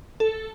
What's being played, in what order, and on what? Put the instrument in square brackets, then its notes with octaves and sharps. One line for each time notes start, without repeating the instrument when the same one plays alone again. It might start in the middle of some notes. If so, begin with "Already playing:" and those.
[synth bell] A4